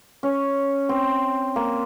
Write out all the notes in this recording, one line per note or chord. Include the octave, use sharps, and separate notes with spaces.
C#4
C4
A#3